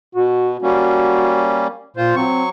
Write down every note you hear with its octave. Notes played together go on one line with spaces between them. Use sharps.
B2 F#4
G3 A#3 C#4 F#4
A#2 F4 C5
F#3 C4 C#6